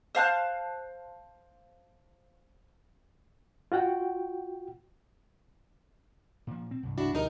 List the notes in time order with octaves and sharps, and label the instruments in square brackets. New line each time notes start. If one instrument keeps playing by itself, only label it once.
[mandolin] C5 F5 A5 F#6
[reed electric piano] F4 F#4 F#5 G5
[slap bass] A#2 F3
C4
C2 G2
[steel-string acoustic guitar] D4 E4 F#4
[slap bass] D2 B2 F3 [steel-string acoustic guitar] D#4 G4 A#4